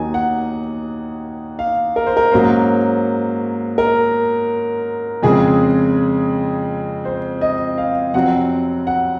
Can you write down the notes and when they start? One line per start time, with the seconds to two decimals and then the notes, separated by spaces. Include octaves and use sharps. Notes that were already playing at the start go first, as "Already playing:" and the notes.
Already playing: D#2 D#3 F#3 G#5
0.14 F#5
1.59 F5
1.96 A#4
2.07 C5
2.17 A#4
2.32 G#2 F#3 A#3 C#4 C5
3.78 A#4
5.23 F2 C#3 G#3 C4 G#4
7.05 C5
7.41 D#5
7.78 F5
8.14 F2 C3 F#3 C4 F#5
8.87 F#5